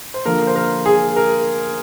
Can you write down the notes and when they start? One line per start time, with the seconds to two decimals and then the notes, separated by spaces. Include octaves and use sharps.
0.14 C5
0.25 D3 F3 A#3 A#4
0.47 C5
0.56 A#4
0.86 G#4
1.16 A#4